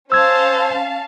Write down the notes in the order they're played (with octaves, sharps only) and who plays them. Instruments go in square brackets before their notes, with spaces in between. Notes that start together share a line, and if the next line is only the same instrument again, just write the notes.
[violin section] C#4 F5 A5 [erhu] C5 [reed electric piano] E6 G#6